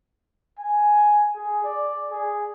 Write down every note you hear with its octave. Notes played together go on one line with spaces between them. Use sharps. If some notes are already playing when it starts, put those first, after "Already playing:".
G#5
G#4
D5
G#4